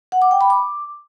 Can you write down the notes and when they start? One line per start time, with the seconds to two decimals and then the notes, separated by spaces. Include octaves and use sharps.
0.12 F#5
0.22 D6
0.31 G5
0.41 B5
0.50 D6